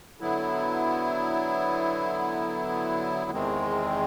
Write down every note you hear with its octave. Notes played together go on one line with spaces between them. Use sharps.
D3 F#3 B3 E4
E2 C3 D#3 G#3 C4